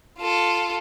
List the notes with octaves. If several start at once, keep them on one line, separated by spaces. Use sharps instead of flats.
F4 A4